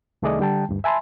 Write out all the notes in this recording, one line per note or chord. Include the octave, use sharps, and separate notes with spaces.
C2 D#3 A3 G#4 D5 D#5
D3 G3 G5 A5
D2 G2
E5 G#5 A5 B5 C6